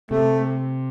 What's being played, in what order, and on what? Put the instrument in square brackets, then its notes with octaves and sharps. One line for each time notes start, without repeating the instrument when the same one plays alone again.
[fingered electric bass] C3 [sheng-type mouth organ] A3